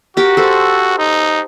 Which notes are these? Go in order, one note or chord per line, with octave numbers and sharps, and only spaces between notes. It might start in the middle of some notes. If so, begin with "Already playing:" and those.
F#4 G4 A#4
A4 C5
D#4